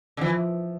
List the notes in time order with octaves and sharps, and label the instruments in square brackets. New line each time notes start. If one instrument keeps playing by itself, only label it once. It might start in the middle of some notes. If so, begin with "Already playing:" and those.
[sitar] D3
[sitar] E3 [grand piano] F3